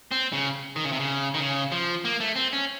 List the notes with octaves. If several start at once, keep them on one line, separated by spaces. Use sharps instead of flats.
C4
C#3
D#3
C#3
C3
C#3
D#3
C#3
F3
A#3
A3
C4
C#4